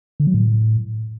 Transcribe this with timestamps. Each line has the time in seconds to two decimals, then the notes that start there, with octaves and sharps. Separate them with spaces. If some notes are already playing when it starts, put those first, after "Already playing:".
0.20 D3
0.27 F#3
0.34 A2